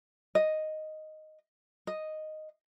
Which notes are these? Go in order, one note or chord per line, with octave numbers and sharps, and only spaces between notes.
D#5
D#5